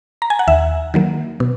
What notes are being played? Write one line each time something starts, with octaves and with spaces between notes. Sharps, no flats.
A#5
G#5
F#5
D#2 E5
D#3 F#3 A#3
B2